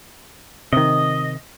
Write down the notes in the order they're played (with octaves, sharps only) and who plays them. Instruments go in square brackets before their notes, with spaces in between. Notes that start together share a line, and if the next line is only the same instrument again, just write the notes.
[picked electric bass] C3 D#3 [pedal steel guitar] D#5